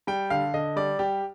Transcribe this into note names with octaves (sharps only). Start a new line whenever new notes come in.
G3 G5
D3 F5
D3 D#5
G3 D5
G3 G4